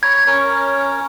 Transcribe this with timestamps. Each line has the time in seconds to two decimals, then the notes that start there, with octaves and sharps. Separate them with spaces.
0.03 C#5 A#5 B5 G#6
0.27 C#4 A#4 C#5